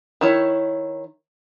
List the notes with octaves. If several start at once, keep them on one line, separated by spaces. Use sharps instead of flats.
D#3 E4 C#5